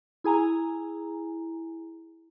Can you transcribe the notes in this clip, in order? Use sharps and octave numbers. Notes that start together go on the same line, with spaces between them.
E4 G#4 G#5 A#5